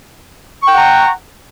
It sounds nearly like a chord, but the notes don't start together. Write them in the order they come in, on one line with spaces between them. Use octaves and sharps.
C#6 G5 F#5 A#5